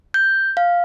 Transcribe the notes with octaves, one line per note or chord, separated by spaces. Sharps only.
G6
F5